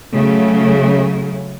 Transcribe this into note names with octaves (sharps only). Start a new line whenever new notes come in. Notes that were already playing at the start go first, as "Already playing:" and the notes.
C#3 F#3 A3